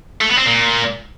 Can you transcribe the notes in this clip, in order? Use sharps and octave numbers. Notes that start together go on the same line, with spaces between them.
A3
B3
C4
A#2